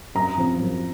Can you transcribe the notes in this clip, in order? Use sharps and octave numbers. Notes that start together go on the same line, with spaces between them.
F#2 A#5
F3 C4
F#2